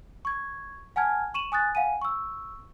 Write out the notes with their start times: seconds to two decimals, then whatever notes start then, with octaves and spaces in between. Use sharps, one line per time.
0.25 C#6 G#6
0.96 F#5 G#5 A5 F6 G#6
1.34 C#6 D#7 E7 F#7
1.52 G#5 D#6 F#6 A6
1.75 F5 F#5 G#5 D#7
2.02 C#6 E6